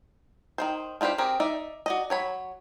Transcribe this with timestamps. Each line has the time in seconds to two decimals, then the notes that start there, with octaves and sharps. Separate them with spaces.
0.58 D#3 E3 C5
1.01 D4 F4 G4 B4 C5
1.18 C4 G4 G#4 A#4
1.40 D#4 D5 E5
1.86 F#4 D5 D#5
2.10 F#3 C#5 B5